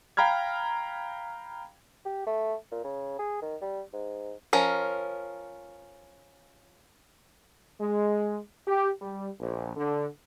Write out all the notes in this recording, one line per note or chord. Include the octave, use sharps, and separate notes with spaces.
F5 G5 A#5 B5 F6 G#6
G4
A3
A#2
C#3
G#4
D#3
G3
G#2
F3 C#4 A#4
G#3
G4
G3
A#1
D3